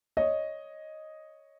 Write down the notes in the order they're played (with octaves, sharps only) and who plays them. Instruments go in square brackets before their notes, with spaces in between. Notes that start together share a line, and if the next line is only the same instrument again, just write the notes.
[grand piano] C#5 D#5